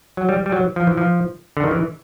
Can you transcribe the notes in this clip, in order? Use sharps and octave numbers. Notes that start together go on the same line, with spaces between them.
F#3
G3
G3
F#3
F3
E3
F3
D3
D#3
E3